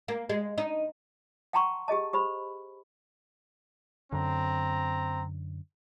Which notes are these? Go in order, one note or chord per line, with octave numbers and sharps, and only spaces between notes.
A#3
G#3
D#4
F#5 G5 A5 A#5 C6 C#6
G4 G#4 D#5 A5
G4 C5 B5
F#2 D3 C4 A#5